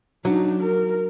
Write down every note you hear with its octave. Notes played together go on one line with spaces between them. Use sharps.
F#3 D4 D#4
A#4